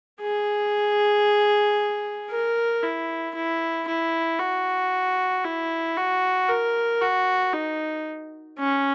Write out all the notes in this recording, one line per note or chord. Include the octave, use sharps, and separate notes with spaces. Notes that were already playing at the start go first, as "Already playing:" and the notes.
G#4
A#4
E4
E4
E4
F#4
E4
F#4
A#4
F#4
D#4
C#4